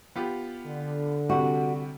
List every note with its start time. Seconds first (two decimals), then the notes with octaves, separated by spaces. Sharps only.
0.16 B3 F4 G4
0.66 D3
1.29 C3 G3 F#4